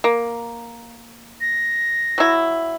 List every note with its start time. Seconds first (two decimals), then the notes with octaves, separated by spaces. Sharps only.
0.04 A#3
1.41 A#6
2.18 F#3 E4